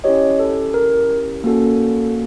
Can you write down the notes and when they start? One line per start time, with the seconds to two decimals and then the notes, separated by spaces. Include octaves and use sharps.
0.04 C#4 E4 G4 C#5 D#5
0.39 A4
0.74 A#4
1.44 A#3 C#4 F#4 A4